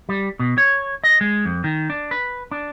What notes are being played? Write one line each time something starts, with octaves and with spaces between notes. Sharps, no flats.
G3
B2
C#5
D#5
G#3
F2
D#3
D4
B4
D4